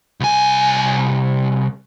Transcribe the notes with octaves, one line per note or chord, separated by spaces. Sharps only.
C2 G#5